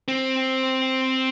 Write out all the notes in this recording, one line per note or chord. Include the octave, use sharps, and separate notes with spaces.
C4